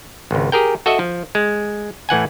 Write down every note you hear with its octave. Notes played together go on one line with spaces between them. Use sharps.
G#1 C#2
G4 G#4 A#4 G5
F#4 A4 D#5 E5
F3
G#3
A2 E3 F#5 G#5